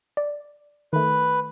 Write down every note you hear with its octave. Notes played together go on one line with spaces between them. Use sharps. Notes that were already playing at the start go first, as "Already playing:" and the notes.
D5
D#3 A3 B4